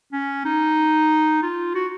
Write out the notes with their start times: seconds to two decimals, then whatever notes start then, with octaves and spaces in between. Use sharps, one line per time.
0.12 C#4
0.45 D#4
1.42 F4
1.75 F#4